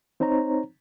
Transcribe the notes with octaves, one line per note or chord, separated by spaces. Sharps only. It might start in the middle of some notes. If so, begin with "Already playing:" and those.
C4 D#4 C5 C#5 A#5